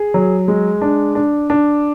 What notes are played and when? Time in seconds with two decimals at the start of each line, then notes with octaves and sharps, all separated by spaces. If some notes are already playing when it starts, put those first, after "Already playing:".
Already playing: G#4
0.14 F#3
0.48 G#3
0.82 D4
1.15 D4
1.50 D4